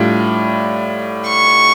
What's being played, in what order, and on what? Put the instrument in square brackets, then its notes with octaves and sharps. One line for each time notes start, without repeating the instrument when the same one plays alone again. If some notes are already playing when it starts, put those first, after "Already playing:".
Already playing: [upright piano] A2 G3 D4 F4
[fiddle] C#6